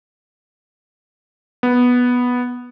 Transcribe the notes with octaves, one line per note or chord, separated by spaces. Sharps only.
B3